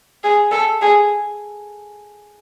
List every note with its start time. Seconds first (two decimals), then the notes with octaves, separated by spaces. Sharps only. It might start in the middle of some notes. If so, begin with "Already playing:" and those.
0.23 G#4
0.51 A4
0.81 G#4